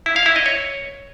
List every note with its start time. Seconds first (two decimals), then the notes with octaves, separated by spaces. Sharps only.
0.06 E4
0.16 F5
0.26 E4
0.36 D#5
0.46 C#5